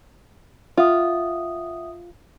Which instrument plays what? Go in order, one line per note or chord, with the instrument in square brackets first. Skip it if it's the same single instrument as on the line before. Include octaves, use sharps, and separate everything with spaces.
[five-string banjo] F4 [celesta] E5 F#5 D#6